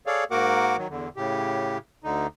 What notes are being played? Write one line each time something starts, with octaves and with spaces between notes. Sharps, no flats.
G#4 A4 C#5 D5 F5
G#2 A#3 F#4 A#4 F#5 D6
D#3 F#3
E2 D3
A2 C#3 G4
D2 D3 D#4